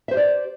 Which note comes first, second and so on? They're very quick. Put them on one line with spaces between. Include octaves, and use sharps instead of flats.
E5 C5 G4 D5